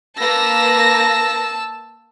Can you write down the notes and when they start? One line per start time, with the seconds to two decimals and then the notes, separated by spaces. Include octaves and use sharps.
0.18 A#3 B4 A5 E6 A#6